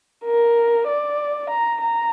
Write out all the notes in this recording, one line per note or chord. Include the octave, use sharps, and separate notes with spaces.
A#4
D5
A#5
A#5